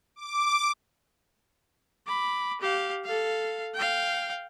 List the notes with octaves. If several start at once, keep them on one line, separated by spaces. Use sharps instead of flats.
D6
B5 D6
G4 F5
A4 F5
F5 G5